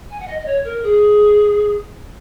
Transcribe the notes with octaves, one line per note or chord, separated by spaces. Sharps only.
G#5
F#5
D#5
D#5
C#5
A#4
G#4